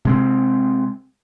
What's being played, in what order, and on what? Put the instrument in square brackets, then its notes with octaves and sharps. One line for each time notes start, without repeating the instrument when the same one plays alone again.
[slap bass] C3 G#3 C4